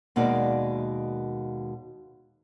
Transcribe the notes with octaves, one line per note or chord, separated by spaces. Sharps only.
D#2 B2 G#3 A#3 D#4 D5